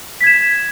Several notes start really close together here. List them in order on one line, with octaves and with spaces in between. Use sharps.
B6 G#6 E7